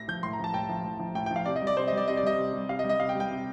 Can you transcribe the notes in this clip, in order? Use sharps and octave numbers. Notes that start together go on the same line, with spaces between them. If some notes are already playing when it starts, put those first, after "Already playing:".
Already playing: A2 A#6
F3 G6
A2 C6
A#5
F3 A5
A2 G5
F3
A2
F3
A2 G5
G5
F3
F5
C3 D5
D#5
G3
D5
C3 C5
D#5
G3
D5
C3 D#5
D5
G3 D#5
C3
G3
C3 F5
D#5
G3
D#5
C3 F5
G5
G3
G5
C3